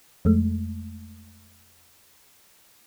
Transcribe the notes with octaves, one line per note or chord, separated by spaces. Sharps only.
F2 G#3 A3